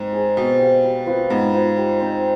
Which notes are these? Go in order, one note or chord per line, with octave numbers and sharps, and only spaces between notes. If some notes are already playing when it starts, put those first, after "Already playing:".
Already playing: G#2 C4
G#4 C5 D#5
B2 C4
G4 B4 F5
G3
C4 F4 B4
G#2 B3
F4 C5
G3
C4 D#4